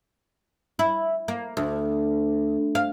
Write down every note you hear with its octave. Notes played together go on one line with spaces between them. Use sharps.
E4
A#3
D2
F5